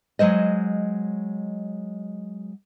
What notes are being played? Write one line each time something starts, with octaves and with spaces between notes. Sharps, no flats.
F#3 G#3 C5 D#5